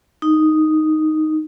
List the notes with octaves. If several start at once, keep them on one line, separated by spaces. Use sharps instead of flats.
D#4